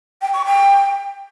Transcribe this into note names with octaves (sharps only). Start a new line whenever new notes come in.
G5
C#6
G5